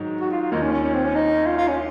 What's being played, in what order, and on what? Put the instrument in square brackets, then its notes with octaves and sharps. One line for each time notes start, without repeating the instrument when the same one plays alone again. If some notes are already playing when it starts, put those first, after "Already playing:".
Already playing: [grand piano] G#2 D#3 F#3
[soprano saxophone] F#4
F4
F4
[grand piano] D#2 D#3 A#3 F4 [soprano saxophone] D#4
[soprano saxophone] C#4
C#4
C#4
C4
C#4
D#4
F4
F4
C#4